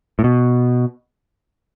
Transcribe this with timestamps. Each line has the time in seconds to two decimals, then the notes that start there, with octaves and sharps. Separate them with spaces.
0.19 A2
0.24 B2